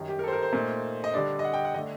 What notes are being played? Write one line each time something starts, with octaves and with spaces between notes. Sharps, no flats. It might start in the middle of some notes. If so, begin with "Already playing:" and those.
Already playing: F#2 D#3 G3
G4
A#4
A4
C5
A#4
C5
A#2 A3 D#4
D#5
D3 G3 D4 D5
D#5
F#5
G5
F#5
D3 A3 D4 D#5